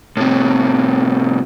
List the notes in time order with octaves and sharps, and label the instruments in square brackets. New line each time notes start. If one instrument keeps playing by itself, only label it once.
[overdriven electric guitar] A2 C3